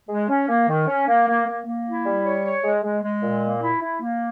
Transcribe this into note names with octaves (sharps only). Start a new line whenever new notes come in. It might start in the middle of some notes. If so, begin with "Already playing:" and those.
G#3
C#4
A#3
D#3
C#4
A#3
A#3
A#3
A#3
E4
G3
C#5
C#5
G#3
G#3
G#3
A#2
A#3
E4
E4
A#3